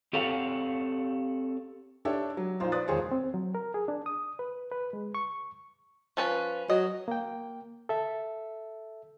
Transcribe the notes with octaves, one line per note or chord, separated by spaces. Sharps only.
C4 G4 A4 C#5 F5 F#5
D4 G4 A4 C#5 D5 E5
F#3
A#1 D#4 F4 C5
B4 C5 D5 D#6 F#6 A6
E1 D#3 F4 G#4 C5 C#5
C4
F#3
A#4
G#4
D4
D#6
B4
B4
G#3
C#6
F3 C#4 B4
F#3 D#5
A#3 G5
A4 E5